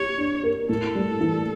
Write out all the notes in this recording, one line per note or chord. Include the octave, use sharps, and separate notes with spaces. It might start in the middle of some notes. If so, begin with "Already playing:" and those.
Already playing: G4 C#5
D4
A#4
A2 A4
G3
E3